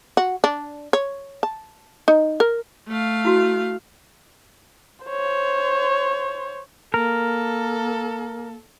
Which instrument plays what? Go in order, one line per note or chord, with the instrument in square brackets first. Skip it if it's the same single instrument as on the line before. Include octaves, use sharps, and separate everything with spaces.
[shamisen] F#4
D4
C#5
A5
D#4
A#4
[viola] A3 F5
[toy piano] E4 F#4
[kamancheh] C5 C#5
[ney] A#3 [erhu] A4 [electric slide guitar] A#4